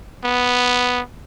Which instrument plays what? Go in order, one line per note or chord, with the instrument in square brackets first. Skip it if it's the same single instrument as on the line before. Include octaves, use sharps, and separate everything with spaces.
[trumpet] B3